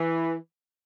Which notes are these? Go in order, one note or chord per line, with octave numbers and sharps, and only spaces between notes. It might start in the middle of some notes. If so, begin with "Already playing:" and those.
Already playing: E3